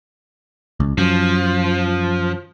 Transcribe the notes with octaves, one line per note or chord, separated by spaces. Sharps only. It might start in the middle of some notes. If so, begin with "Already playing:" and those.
C#2
F#2 F3